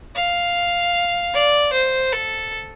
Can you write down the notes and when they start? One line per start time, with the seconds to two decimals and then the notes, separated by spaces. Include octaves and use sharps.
0.15 F5
1.34 D5
1.73 C5
2.13 A4